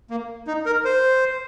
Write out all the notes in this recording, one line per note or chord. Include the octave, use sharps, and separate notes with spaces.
A#3
D#4
A#4
C5